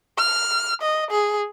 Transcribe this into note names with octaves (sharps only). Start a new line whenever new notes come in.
F6
D#5
G#4